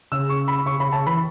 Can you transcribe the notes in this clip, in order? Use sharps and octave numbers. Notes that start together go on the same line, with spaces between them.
C#3 E6
C#6
B5
C#3 C#6
C#3 B5
C#3 A5
E3 B5